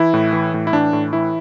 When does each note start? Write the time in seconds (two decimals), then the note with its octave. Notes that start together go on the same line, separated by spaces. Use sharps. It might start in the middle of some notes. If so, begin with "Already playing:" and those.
Already playing: E3 E4
0.14 A2
0.33 E3
0.54 A2
0.67 E4
0.73 E3 D4
0.93 A2
1.13 E3 E4